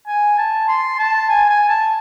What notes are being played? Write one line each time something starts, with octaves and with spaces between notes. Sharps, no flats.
G#5
A5
C6
A5
G#5
G#5
A5